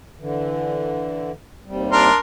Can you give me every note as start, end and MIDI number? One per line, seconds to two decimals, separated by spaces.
0.19 1.31 50
0.19 1.31 52
1.66 2.10 39
1.66 2.10 48
1.66 2.10 55
1.92 2.18 62
1.92 2.18 70
1.92 2.18 84